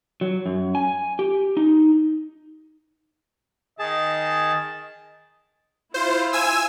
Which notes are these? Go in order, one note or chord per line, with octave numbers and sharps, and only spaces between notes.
F#3
F#2
G#5
G4
D#4
D#3 G#4 D#5 A5
E4 F4 C5
G#5 E6